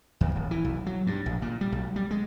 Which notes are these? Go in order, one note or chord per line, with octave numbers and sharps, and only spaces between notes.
D#2
D#1
E3
B1
F#3
G2
A#1
A#2
G3
B1
G3
G#3